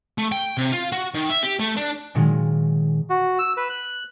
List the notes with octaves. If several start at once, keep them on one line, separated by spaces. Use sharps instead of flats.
A3
G5
C3
F4
F#4
D#3
E5
G4
A3
D4
A#2 D#3 F#3 G#3
F#4
E6
B4
F#6